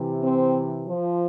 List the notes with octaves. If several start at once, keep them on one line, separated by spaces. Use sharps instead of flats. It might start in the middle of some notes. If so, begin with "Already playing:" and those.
Already playing: C3 E3
C4
F3